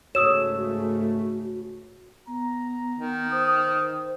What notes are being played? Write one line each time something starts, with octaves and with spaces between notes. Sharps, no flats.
G#2 C#3 A3 F#4 C#5 D#6 E6 E7
B3 A#5
D#3
C5 D#6